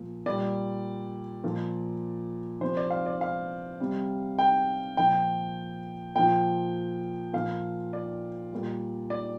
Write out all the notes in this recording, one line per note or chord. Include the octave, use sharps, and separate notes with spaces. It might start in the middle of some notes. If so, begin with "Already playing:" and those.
Already playing: A#2 F3
A#2 G3 D5
A#2 F3
C3 F3 C5
D5
F5
D5
F5
C3 G3
G5
A#2 F3 G5
A#2 F3 G5
A#2 F3 F5
D5
A#2 G3
D5